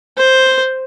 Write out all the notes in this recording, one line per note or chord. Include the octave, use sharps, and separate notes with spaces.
C5